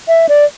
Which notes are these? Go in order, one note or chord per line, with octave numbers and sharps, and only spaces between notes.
E5
D5